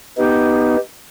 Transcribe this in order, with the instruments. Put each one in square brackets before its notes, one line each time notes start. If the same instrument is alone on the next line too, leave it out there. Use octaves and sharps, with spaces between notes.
[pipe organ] B3 D#4 [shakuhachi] G4